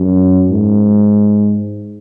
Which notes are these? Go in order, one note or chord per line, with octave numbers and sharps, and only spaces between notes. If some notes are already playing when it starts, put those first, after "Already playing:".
Already playing: F#2
G#2